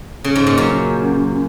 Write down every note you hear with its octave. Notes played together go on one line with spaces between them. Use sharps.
C#3
G#2
A#2
F#2